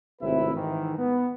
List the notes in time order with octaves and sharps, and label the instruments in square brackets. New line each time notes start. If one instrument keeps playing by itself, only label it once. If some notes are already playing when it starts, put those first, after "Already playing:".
[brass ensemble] G#1 A2 C3 E4 B4 E5
G#2 D#3 E3
B3